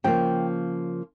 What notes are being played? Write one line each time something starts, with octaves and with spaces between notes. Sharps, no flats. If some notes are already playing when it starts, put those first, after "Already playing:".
C#3 F3 A#3 G5